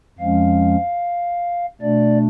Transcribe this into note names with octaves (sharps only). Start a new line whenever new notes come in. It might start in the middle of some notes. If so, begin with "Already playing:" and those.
F2 F3 G#3 C#4 F5
B2 A3 D4 D5